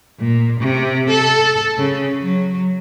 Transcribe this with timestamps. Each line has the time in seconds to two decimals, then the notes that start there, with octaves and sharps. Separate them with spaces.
0.19 A#2
0.60 C3
1.09 A4
1.77 C#3
2.21 F#3